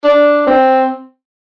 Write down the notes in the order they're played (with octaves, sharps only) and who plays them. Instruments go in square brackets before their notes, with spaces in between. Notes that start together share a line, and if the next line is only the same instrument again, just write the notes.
[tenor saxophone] D4
C4